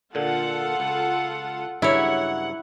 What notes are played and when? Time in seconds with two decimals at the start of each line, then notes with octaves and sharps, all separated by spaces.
0.15 A#2 D3 F4 A4 F#5
0.80 C#2
1.82 G2 C#3 F#3 E4 C#5 F#5